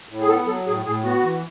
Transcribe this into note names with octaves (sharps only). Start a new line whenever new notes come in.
A2
G#4
B3 A4
F#3 A4
A2 G#4
A2 G#4
B3 F#4
E3